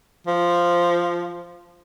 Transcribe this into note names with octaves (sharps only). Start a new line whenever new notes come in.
F3